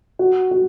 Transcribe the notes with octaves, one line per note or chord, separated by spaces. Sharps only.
F#4
F#4